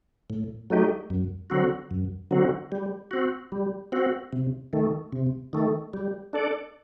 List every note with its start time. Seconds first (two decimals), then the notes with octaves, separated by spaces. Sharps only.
0.30 A2
0.70 F#3 A3 D#4 G4
1.10 F#2
1.50 D3 F#3 C4 F#4
1.91 F#2
2.31 D3 F#3 C4 F#4
2.72 G3
3.11 C4 F#4
3.52 G3
3.92 C4 F#4
4.33 C3
4.73 D#3 A3
5.12 C3
5.53 D#3 A3
5.93 G3
6.33 D4 A4 D5